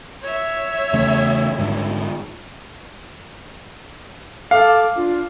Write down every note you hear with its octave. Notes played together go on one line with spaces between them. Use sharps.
C#5 E5
E2 C#3 A3
G#2 D3 G3
A4 F5 D6
D4 F4